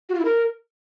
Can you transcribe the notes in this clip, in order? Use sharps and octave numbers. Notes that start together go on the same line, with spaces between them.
F#4
F4
E4
A#4